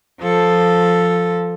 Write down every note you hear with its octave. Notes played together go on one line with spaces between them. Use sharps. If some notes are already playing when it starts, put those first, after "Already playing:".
F3 A4